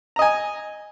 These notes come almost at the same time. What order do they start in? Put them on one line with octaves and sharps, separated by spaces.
A#5 D#5 G#5